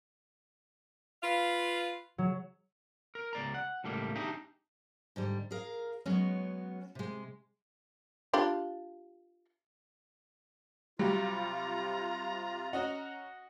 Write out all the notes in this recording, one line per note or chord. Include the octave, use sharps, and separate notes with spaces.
F4 B4 F5
F#3
A#4
C#2 D5 A#5
F#5
C#2 A2 G3 A#3
D4 D#4 G4 G#4 E5 A#5
G#2 D3 G3
G#4 A#4 F5
F#3 G#3 B3 C#4
C3 G#3
D4 F4 G4
C3 F#3 G3 F4 G4 A#5
C#4 F#4 D#5 F#5